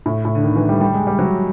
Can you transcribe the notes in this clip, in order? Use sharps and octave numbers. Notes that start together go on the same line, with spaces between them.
A2
A2
D3
D#3
E3
G3
G3
G#3
G3
F#3